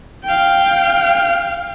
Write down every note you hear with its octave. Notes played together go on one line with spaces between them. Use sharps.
F5 G5